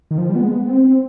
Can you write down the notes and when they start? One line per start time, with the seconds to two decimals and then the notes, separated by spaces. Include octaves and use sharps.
0.11 D#3
0.18 F3
0.29 G3
0.35 B3
0.40 G#3
0.51 B3
0.63 B3
0.68 C4
0.84 C4